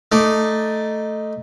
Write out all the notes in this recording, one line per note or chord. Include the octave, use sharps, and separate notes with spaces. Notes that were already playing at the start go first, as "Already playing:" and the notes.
A3 D#4 D5